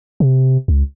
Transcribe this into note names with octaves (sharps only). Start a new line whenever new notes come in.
C3
C#2